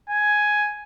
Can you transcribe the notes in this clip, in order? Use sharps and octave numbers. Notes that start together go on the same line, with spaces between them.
G#5